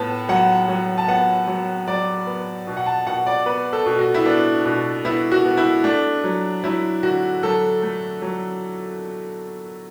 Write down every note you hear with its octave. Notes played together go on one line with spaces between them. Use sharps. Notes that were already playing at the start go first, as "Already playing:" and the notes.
Already playing: A2 B3 A5
F#3 F#5
F#3
A5
B3 F#5
F#3
F#3 D5
B3
B2
F#5
A5
B2 F#5
D5
B3 B4
A4
B2
F#4
E4
B3 D4
B2
B3 E4
F#4
B3
E4
A3 D4
F#3
F#3 E4
D3 F#4
F#3 A4
A3
F#3